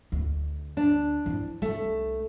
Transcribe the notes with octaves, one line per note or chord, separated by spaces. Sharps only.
D2
D4
F3 E4
C2 A3